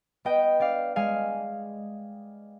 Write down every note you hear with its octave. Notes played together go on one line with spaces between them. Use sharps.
B3 D#5 G5
D4 D5 F5
G#3 F5 G#5